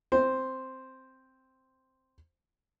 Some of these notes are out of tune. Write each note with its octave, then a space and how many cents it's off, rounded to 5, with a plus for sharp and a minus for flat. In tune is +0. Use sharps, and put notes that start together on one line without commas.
C4 +0 C5 +0